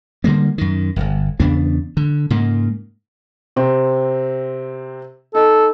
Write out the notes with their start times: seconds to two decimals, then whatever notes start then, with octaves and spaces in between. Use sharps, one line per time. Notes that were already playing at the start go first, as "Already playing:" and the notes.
0.24 D3 G3 G#3 A#3
0.58 F#2 D#3
0.96 D1 G1
1.40 E2 C#3 B3 D4
1.97 D3
2.30 G#2 C#3 A#3
3.56 C3 C4
5.35 D#4 A4